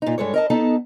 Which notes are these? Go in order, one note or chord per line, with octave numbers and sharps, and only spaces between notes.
A#2 D#4
G2 G#3 A4 C#5
A#4 D#5 A5
B3 D#4 A4 D#5 A5